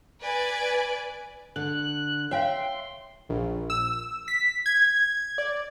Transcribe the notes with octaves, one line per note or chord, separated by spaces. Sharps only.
B4 D5 G#5 D7
D3 F#6
C#5 E5 F5 G5 C6
A#1
E6
B6
G#6
D5